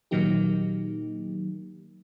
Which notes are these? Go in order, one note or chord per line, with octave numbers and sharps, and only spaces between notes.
A#2 D#3 F#3 A#3 D#4 G4